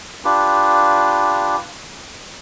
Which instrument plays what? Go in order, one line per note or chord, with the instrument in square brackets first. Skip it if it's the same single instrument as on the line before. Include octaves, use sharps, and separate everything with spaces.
[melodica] D4 F4 G4 B4